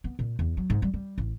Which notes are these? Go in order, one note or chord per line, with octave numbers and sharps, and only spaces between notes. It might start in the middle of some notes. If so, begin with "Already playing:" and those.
B3
A#2
E2
F#3
G#2
G3
G3
A1